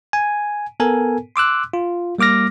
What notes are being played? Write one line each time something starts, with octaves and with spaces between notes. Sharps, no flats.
G#5
B3 A4 A#4 G#5
C6 D6 E6 F#6
F4
G3 A#3 D6 F6 A#6